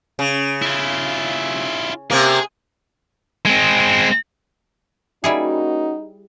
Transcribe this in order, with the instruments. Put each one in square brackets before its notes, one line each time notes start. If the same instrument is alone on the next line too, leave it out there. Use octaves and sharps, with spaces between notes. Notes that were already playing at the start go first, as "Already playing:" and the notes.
[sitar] C#3
[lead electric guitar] E4 F4
[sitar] C3 A#3 [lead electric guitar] G#4
[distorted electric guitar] G#3 C4
[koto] G3 E4 G#4 [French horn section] A#3 C#4 F#4 [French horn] D#4